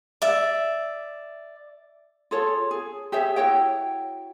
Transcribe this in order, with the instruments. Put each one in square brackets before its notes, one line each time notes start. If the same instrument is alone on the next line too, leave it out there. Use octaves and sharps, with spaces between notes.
[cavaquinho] D5 E5
[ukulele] F4 G#4 A4 C#5
G#4
G4 G#4 C#5 E5
E4 F#4 C#5 G5